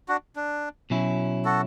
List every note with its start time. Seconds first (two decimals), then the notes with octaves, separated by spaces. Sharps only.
0.08 D4 F#4
0.36 D4
0.90 B2 F#3 C#4 E4
1.45 F#4 A4